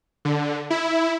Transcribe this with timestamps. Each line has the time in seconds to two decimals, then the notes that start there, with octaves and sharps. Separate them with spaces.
0.25 D3
0.70 E4